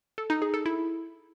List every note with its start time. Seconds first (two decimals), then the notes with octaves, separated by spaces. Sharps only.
0.18 A4
0.30 D#4
0.42 G#4
0.54 A4
0.66 E4